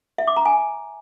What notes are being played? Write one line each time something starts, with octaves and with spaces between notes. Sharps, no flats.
E5
D6
A#5
G#5